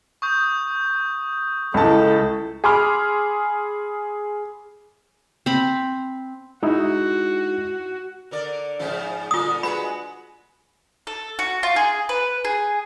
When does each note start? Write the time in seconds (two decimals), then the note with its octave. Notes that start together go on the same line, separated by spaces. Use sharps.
0.22 C#6 D#6 G6
1.74 C#2 E4 A4 A5
2.64 G#4 B5 C6 D6 F6
5.46 C4 B5
6.63 G#3 D#4 E4 F#4
8.31 D3 A#4 D5
8.79 G#2 C#3 F3
9.31 A#2 D3 F4 D#6
9.63 G#3 F#4 B4 B5
11.07 A4
11.39 F#4
11.63 F4
11.76 G#4
12.09 B4
12.45 G#4